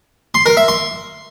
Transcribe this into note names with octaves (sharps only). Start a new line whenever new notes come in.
C6
A#4
E5
C6